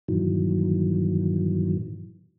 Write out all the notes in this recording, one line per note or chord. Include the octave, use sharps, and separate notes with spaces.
G2 A#2 D#3 E3 F#3